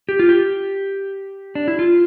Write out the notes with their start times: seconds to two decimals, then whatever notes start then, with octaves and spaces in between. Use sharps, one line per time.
0.09 G4
0.19 F4
0.29 G4
1.55 D4
1.68 E4
1.79 F4